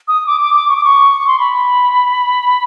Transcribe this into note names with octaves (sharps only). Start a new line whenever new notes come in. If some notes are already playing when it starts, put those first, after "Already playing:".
D#6
D6
D6
D6
C#6
D6
C#6
C6
B5